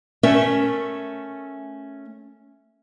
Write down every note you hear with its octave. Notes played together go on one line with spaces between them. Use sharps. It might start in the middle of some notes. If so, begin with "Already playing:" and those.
A3 C#4 A#4 E5